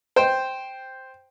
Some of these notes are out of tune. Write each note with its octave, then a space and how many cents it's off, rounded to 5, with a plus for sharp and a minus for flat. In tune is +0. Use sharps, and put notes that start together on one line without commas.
C5 +0 G5 +0